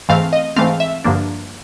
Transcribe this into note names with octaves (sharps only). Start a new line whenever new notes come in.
G#2 E3 A3 C4 F5
D#5
G#2 E3 A3 C4 F5
E5
G2 D3 F3 A#3 D4